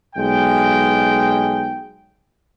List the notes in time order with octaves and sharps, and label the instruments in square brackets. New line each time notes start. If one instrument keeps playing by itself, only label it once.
[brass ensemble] B1 G#3 G5